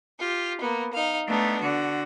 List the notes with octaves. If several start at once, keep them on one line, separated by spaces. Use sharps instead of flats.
F4 G4
A#3 B3
D#4 F5
A3 B3 D4 D#4
D3 F#4